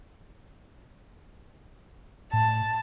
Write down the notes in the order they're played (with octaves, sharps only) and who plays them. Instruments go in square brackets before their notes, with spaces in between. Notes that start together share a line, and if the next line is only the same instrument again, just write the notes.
[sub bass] A2 [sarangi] A5